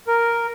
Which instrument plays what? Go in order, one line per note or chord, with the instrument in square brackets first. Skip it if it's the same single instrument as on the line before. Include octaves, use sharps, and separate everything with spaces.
[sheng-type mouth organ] A#4